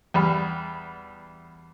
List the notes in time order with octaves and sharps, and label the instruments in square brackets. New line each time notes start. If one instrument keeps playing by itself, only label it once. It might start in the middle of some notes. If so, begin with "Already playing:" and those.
[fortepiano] E2 G3 B5